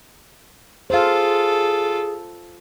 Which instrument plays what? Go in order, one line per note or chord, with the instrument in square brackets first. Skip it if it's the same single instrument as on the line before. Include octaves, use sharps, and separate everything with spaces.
[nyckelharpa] F4 A4 [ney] G#4 [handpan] C5 F5